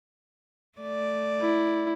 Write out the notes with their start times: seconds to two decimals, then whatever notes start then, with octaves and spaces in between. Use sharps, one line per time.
0.79 A3 D5
1.41 E4